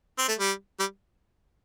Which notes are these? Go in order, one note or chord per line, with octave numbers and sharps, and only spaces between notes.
C4
A3
G3
G3